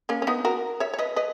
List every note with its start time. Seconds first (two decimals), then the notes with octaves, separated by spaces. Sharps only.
0.09 A#3 C#4
0.22 C#4
0.27 B3 D#4
0.45 F#4 A#4
0.80 C#5 E5
0.93 C#5
0.99 B4 D#5
1.16 B4 D#5